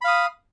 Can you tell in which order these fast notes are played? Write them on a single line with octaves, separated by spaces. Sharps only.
B5 F5 D#6